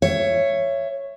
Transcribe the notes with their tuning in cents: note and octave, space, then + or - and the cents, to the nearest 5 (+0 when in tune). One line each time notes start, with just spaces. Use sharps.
C#5 +0 E5 +25